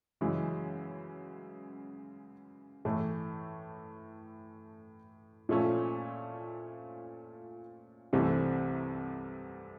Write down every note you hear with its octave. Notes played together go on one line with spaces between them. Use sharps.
F#2 C#3 E3 G#3
A2 E3 A3
A#2 F3 A3 C#4
C2 C3 E3 A3 C4